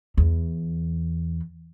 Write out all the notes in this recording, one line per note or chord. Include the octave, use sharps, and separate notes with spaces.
E2